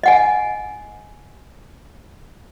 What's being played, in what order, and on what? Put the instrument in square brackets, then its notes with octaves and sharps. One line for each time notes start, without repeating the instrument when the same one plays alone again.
[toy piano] D#5 F#5 G#5